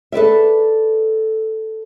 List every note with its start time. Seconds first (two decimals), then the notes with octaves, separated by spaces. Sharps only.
0.12 A4 B4 D5 E5